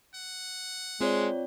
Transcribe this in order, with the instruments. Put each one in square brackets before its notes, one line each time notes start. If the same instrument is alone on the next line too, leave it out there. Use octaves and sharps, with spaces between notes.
[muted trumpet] F#5
[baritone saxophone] G#3 [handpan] C4 [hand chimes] F4 C#5 D5